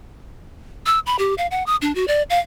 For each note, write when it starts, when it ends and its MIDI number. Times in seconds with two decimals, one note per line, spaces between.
0.86 0.99 88
1.06 1.16 83
1.19 1.34 67
1.38 1.47 77
1.51 1.65 78
1.66 1.76 87
1.82 1.94 62
1.95 2.07 66
2.08 2.22 74
2.30 2.39 77